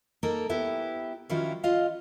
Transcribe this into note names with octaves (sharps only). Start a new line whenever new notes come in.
A#3 D#4 A4 A#4
B3 E4 G4
D#3 F3 F#3 C#4 E4 F4
F4 D#5 F5